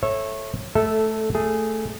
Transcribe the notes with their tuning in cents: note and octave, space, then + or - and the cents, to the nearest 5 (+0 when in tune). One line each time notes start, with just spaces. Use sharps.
A4 +0 C#5 -25 E5 -5
A3 -15 A4 +0 E5 +0
A3 +0 G#4 +0